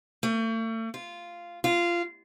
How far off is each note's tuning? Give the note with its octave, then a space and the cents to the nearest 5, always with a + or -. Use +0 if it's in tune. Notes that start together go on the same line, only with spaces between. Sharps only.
A3 +40
F4 -10
F4 -15